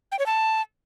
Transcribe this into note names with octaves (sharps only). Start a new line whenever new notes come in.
G5
C#5
A5